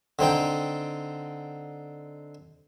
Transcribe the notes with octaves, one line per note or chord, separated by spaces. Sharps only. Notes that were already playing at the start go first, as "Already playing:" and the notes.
D3 C4 D#4 G5